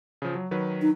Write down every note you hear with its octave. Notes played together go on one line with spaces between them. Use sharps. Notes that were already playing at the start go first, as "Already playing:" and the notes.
C#3 F3
F#3
D#3 F#3 B4
D#4